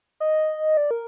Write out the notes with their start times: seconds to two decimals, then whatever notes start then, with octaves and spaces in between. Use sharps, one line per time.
0.20 D#5
0.77 D5
0.91 A#4